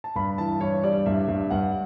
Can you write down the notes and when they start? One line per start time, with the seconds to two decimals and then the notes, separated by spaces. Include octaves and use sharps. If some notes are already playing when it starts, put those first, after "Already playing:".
0.04 A5
0.16 G2 B5
0.38 E3 A5
0.61 G2 C#5
0.83 G3 D5
1.06 G2 E5
1.28 G2
1.51 G2 F#5